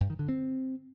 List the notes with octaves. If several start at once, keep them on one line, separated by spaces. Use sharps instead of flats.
G2
D#3
D3
C4